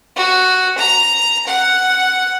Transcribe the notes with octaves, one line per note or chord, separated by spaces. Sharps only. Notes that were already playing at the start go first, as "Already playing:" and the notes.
F#4
A#5
F#5